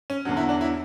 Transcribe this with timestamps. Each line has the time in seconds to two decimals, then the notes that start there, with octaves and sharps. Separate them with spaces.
0.10 C#4
0.25 E2 D3 F#3 C#4
0.37 E4
0.49 D4
0.61 E4